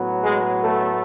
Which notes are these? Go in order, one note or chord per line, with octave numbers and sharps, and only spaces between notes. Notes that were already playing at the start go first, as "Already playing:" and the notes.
Already playing: A2 F#3 B3
G#3 G#4
A3 A4